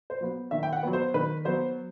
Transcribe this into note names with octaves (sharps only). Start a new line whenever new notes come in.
C5
F#3 B3
D#3 E5
G5
F#5
F#3 B3
C5
D#3 B4
F#3 B3 C5